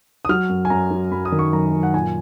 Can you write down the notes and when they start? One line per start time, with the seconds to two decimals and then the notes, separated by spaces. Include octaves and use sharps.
0.25 D#6
0.29 F#3 F6
0.49 F#2
0.65 G#5
0.70 F#2 A#5
0.91 F#3
1.11 F#2 B5
1.25 D#6
1.32 D#3
1.39 C#6
1.53 F#2 A#5
1.73 F#2
1.83 F#5
1.94 A#2 G#5